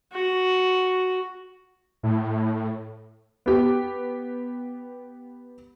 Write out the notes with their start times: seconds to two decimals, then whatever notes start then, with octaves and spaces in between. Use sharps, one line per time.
0.13 F#4
2.03 A2
3.46 B3 G4